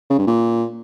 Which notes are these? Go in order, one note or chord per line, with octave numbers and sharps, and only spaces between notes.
C#3
G2
A#2